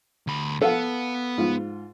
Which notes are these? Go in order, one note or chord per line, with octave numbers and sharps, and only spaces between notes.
D2 B5
B3 A4 F5 F#5
G#2 F4